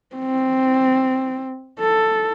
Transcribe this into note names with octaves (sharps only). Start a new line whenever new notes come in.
C4
A4